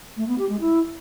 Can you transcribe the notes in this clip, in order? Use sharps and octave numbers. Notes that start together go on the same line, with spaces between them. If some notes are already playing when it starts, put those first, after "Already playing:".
A3
B3
G4
G#3
E4